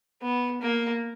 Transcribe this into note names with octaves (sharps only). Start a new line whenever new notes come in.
B3
A#3